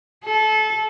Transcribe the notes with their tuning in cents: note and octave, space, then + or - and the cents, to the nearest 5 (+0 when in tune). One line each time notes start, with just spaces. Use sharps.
A4 -25